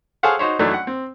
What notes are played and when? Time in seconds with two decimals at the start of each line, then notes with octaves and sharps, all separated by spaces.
0.23 G#4 A4 C5 C#5 F5 F#5
0.39 D#4 F#4 C5 C#5
0.59 F#2 E3 F#3 A3 D4 D#4
0.74 F#5
0.87 C4